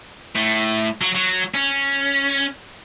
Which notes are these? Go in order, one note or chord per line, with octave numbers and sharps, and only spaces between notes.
A2
F#3
F#3
C#4